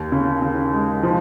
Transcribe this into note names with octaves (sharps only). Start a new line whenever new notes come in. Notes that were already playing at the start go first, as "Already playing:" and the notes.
Already playing: D#2
C#3
C#3
G#3
F3